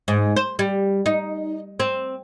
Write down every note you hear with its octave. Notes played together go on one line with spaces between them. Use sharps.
G#2
C5
G3
D#4
C4